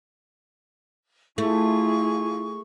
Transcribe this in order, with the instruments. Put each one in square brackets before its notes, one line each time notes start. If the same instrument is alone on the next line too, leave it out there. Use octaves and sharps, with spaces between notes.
[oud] A3 [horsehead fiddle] E4 F4 [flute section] G#4 C#6